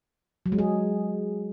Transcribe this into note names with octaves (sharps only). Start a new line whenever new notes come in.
F#3
G#3
G#4